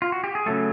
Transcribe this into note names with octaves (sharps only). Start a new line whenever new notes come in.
F4
F#4
G4
G#4
C#3 F#3 A3 A4